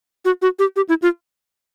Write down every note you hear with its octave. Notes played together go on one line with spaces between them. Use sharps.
F#4
F#4
G4
G4
E4
F4